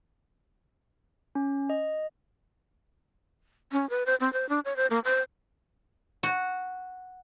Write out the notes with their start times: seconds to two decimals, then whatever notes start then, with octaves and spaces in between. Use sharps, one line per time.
1.35 C#4
1.70 D#5
3.72 C#4
3.90 B4
4.06 C5
4.20 C4
4.33 C5
4.49 D4
4.65 C#5
4.76 C5
4.90 A#3
5.05 C5
6.23 F#4